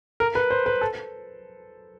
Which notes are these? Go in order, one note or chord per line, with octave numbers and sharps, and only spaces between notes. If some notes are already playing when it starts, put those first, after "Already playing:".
A#4
B4
C5
B4
A4